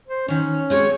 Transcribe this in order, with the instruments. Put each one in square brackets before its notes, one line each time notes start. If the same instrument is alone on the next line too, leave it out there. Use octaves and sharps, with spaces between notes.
[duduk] C5
[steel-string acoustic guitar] D#3 C#5 [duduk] C#4
[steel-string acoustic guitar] F#3 G#3 C4 [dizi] C#5